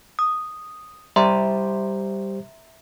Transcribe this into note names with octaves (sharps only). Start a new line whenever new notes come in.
D#6
G3 G4 C5 E5 A#5 C6